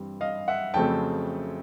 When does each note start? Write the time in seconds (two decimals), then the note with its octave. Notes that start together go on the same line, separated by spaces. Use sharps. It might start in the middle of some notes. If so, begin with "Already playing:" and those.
Already playing: G2 E3 G3 C4
0.21 D#5 F5
0.48 E5 F#5
0.74 F2 C#3 F#3 A3 C4 G5 A5